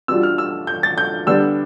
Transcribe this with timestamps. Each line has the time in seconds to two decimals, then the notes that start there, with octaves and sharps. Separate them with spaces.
0.08 B2 G3 D4 F4 E6
0.23 F6
0.38 E6
0.67 G6
0.83 A6
0.98 G6
1.27 D3 G3 B3 D4 E6